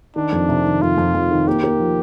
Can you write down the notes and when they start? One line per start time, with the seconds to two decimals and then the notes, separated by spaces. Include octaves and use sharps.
0.16 D#3 D4
0.32 F2
0.49 C3
0.65 D#3
0.82 F2 F4
0.98 F2
1.14 F2
1.31 D#3
1.48 A#3 G4
1.64 A#3
1.80 F3